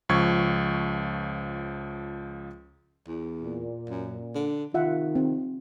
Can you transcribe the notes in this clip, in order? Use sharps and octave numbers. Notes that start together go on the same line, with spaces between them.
C#2 F3 C#6 G#6
E2
A#2
F#2
D3
C3 D#3 F4 E5 F#5
C4